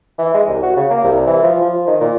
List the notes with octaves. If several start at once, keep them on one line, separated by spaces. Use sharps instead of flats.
E3
G#3
C2
F#4
C#3
A#3
C2
E3
F3
F3
D#3
A#2